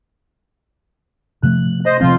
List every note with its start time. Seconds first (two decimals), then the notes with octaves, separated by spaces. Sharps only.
1.43 C3 F3 A3 F#6
1.86 C5 D#5
2.01 F2 C3 F3 C4 F4 G6